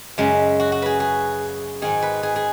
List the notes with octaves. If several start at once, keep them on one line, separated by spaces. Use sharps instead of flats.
F#2 C#3 G#3
F#4
F#4
G#4 B4
G#4
G#2 D#3 G#4
B4
G#4
G#4